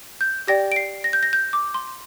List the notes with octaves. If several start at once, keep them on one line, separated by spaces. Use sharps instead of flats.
G6
G4 D5 G5 A#6
D7
C7
A#6
G6
A#6
G6
D6
C6